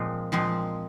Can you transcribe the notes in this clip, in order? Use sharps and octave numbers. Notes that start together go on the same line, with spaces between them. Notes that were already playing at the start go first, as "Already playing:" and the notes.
Already playing: A#2 F3 G#3 C4
A#2 F3 G#3 C4